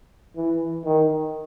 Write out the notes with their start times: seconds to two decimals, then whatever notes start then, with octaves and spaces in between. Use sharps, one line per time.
0.36 E3
0.85 D#3